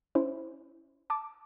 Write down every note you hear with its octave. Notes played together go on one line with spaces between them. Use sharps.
C#4 E4 C5
A5 D6